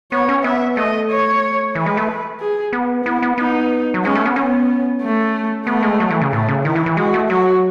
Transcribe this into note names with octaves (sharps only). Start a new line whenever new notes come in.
B3 C#5
C#4
B3 E5
A3 D#5
C#5
E3 B4
G#3
A3
G#4
B3
B3 E4
B3
B3 D#4
F#3
G#3 C#4
A3
B3
B3 C#4
A3
A3 B3
G#3
F#3
E3
C#3
A2 A3
C#3
D#3 E4
E3
E3
G#3 F#4
A3
F#3 F#4